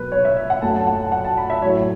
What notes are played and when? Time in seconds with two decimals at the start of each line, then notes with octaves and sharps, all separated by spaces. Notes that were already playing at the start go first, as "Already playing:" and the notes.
Already playing: B2 F#3 B4
0.12 C#5
0.25 E5
0.36 E5
0.50 F#5
0.62 F#2 F#3 A3 A5
0.76 A5
0.87 F#5
1.05 A5
1.12 F#5
1.24 A5
1.37 B5
1.50 E5
1.62 A2 F#3 A3 C#5